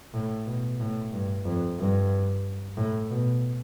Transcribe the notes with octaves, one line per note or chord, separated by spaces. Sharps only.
A2
B2
A2
G2
F2
G2
A2
B2